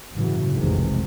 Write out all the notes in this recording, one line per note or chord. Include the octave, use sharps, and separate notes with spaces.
G1 A2 C#3 E3 F#3
F1 A#1 C3 D#3 E3 G#3